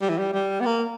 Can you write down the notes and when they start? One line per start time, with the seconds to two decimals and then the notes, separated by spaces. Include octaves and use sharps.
0.02 G3
0.10 E3
0.18 G3
0.34 G3
0.61 B3
0.66 A#3